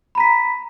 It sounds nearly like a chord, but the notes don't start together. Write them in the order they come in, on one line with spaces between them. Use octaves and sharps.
B5 A#5 B6